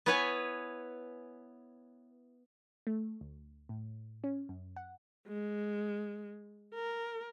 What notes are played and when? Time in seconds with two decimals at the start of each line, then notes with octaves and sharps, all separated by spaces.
0.06 B3 E4 B4 C#5 G#5
2.87 A3
3.21 D2
3.69 A2
4.24 C#4
4.49 F#2
4.76 F#5
5.28 G#3
6.75 A#4